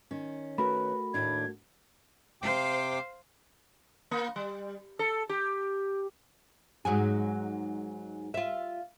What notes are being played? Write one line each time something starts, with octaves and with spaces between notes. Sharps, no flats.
D#3 C#4
A3 F#4 A#4 B4 B5
D#2 A2 D4 G#6
C3 C5 F5 G5 D6
A#3
G3
A4
G4
G#2 F#3 G#4
F4 E5